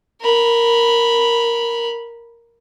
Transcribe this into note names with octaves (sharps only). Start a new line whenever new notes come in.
A#4 B5